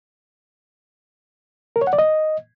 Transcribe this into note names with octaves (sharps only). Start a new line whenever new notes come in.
A#4
C#5
F#5
D5
D#5